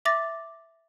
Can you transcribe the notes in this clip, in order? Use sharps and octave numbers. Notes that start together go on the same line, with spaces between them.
E5 D6 A6 A#6